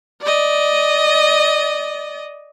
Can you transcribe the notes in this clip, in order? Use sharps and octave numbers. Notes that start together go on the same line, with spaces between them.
D5 D#5